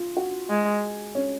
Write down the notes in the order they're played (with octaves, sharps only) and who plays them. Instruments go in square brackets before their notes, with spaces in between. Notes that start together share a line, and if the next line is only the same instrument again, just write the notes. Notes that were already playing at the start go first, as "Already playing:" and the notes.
Already playing: [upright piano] F4
F#4
[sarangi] G#3
[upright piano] C#4